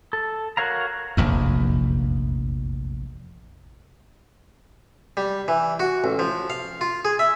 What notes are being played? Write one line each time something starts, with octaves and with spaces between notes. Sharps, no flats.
A4
F#4 A#4 C#5 F5 A#5
F1 A#1 E2
G3
E3
F#4
A1
F3
F5
F4
G#4
E5